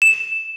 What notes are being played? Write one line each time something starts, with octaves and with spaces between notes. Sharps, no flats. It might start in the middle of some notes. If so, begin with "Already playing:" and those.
E7